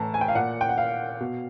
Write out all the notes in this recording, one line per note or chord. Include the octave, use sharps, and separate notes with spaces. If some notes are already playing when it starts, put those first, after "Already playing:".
Already playing: A2 E3 A5 A#5
G#5
G5
F5
A#2 F#5
G5
F#5
F5
B2